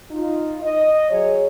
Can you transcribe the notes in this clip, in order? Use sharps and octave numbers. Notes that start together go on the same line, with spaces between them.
D#4 F4
D#5
F#3 G#4 C#5